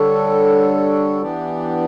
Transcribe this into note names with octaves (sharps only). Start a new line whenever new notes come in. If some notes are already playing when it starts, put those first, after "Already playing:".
Already playing: D3 G3 D4 A4 C#5
E3 B3 D4 G4 D5